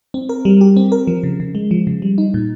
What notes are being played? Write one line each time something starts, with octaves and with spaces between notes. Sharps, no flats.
C4
A#4
G3
G4
C4
A#4
F3
C#3
C#3
G#3
F3
C#3
G3
D#4
A#2